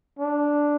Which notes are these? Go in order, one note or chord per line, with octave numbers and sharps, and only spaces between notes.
D4